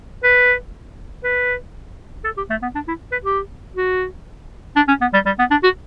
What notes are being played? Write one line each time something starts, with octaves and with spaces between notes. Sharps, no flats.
B4
B4
A4
G4
A3
B3
D4
E4
B4
G4
F#4
D4
C#4
B3
G3
G3
B3
D4
F#4